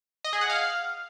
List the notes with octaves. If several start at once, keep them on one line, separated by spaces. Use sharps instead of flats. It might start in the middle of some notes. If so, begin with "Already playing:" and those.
D#5
G#4
F#5
F5